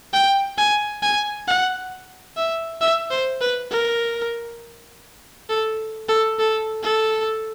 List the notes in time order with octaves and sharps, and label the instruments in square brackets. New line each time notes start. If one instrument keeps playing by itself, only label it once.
[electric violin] G5
G#5
G#5
F#5
E5
E5
C5
B4
A#4
A4
A4
A4
A4